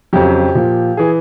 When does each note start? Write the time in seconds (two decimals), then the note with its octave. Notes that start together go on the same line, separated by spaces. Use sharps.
0.13 F2 C#3 F#3 G4
0.55 A#2 F3
0.97 E3 G#4